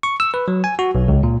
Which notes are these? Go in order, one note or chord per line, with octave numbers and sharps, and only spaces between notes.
C#6
E6
B4
F#3
G#5
F#4
B1
C#2
A#2